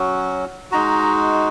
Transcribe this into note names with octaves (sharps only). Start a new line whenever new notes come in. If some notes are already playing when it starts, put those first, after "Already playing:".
Already playing: F#3 C#4 F#4
G#3 D#4 F#4 A#5